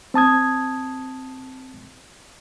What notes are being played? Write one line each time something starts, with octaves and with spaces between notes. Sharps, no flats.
C4 A5 D#6 G#6